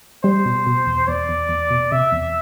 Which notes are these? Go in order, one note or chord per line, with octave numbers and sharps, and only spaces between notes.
G3 C5
B2
B2
E2
E2 D5
E2
E2
B2
C3 E5
E2